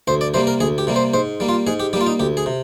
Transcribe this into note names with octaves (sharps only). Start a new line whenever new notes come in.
D2 C5
D5
C3 G3 A#3 C5
A#4
D2 G#4
G4
C3 G3 A#3
C5
G#2 C5
G3 A#3
F4
G#2 G#4
G4
G3 A#3 F4 G4
D#4
D2 G4
G#4
C3